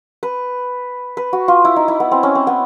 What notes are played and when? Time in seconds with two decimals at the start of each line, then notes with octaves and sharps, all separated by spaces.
0.23 B4
1.17 B4
1.33 F#4
1.48 F4
1.65 E4
1.76 D#4
1.88 E4
2.00 B3
2.12 C4
2.23 C#4
2.35 C4
2.47 B3